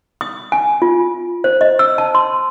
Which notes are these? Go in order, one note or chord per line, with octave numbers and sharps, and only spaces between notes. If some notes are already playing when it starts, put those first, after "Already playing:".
D#6
G#5
F4
C5
D#5
E6
A5
C6